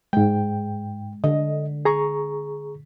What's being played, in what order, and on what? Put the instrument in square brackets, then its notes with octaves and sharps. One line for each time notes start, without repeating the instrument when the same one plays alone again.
[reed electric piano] G#2 G5 [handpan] G#3
[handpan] D3 [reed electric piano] D#5
[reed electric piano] G#4 A#5 C#6